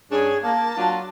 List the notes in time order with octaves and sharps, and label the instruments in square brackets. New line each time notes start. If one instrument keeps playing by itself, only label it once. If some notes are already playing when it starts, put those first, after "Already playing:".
[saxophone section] G2 C#4 D4 [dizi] G#4
[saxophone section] A#3 [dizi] A5
[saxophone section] F#3 D4 F4